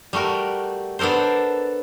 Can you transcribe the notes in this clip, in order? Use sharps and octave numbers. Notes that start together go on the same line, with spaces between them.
G3 A3 F#4 A#4
B3 D4 A4 A#4 C5